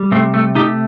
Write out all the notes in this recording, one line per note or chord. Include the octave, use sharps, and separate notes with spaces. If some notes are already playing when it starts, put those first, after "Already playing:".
Already playing: G3
C3 A3 C4
A3
A3 D#4 G4